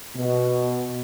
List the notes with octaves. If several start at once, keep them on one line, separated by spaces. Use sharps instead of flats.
B2